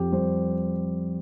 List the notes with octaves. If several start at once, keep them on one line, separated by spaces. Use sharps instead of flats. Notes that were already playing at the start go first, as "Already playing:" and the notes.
Already playing: F2 G4
G3 C5